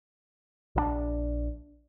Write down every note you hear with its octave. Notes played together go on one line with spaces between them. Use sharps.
A#1 D#3 D4